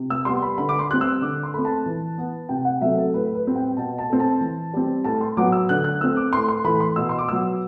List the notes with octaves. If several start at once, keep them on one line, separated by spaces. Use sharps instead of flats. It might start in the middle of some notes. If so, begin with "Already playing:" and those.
Already playing: C3
E6
G3 B3 C6
B5
D3 B5
D6
C6
G3 C4 F#6
E6
D3 D6
C6
A3 C4 B5
A5
E3
B3
C3 G5
F#5
F#3 A3 C4 E5
A4
A2 B4
B4
G3 C4
G5
B2 A5
A5
A3 C4
A5
E3
G3 C4
A2 A5
C6
F#3 B3 D6
E6
D3 F#6
F#6
A3 C4 E6
D6
A2 C6
C6
E3 A3 B5
C6
B2 E6
C6
D6
F#3 B3 E6